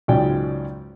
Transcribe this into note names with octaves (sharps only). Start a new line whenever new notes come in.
C#2 G#2 F#3 C#4 D5 G5